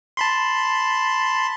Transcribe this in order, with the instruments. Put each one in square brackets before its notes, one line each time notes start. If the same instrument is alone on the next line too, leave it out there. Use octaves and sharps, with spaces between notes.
[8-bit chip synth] A5 B5 C6